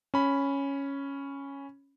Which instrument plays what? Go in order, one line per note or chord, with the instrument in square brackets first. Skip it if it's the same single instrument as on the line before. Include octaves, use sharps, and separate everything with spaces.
[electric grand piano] C#4 B5